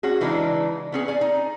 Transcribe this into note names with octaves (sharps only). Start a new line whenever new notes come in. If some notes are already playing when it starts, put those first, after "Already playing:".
C#4 F#4 G#4
C#3 E3 G#3 D4 D#4
B3 C#4 G#4
D5 G#5
D#4